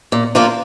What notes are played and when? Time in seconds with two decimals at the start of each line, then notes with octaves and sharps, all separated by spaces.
0.12 A#2
0.35 F3 A#3 D4 F4